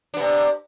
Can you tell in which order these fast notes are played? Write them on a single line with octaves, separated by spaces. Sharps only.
D4 B3 C3